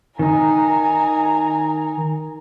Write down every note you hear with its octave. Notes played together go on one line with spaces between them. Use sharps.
D#3 D#4 G#5 A#5